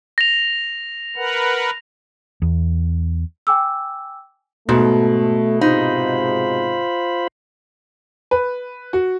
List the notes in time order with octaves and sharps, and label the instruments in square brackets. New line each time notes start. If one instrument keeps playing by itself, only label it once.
[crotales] A#6 F7
[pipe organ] A#4 B4 F#5
[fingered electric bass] E2
[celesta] G5 G#5 D6 E6
[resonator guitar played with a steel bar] G#2 [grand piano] B2 [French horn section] A3
[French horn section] G#2 C3 [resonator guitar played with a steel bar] D#4 [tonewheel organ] F4 C5 B5
[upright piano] B4
F#4